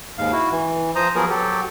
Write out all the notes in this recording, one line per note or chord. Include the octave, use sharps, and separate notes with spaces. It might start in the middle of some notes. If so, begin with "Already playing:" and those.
D#2 G#2 F5
E4 F#4
E3
F3 C5 A#5 D#6
F3 F#3 B3 G#4 A#4
F#3 G4 A4